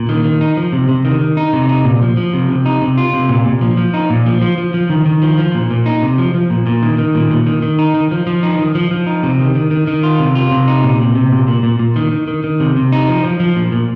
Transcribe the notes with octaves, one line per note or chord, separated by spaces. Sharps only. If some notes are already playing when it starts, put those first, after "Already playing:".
Already playing: A#2
D#3
D#3
D#4
F3
C3
C3
D#3
D#3
D#4
C3
D#4
A#2
F3
F3
C3
C3
D#4
C3
F4
C3
A#2
A#2
F3
F3
D#4
A#2
F3
F3
F3
F3
D#3
D#3
F3
F3
A#2
A#2
D#4
C3
F3
F3
A#2
A#2
D#3
D#3
A#2
A#2
D#3
D#3
D#4
D#3
F3
F3
D#4
D#3
F3
F3
D#4
C3
D#3
D#3
D#3
D#3
F4
C3
F4
C3
D#4
A#2
C3
C3
A#2
A#2
A#2
A#2
D#3
D#3
D#3
D#3
C3
C3
D#4
F3
F3
F3
A#2
A#2